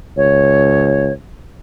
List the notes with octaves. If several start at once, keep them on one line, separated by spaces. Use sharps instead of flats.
C#2 C#5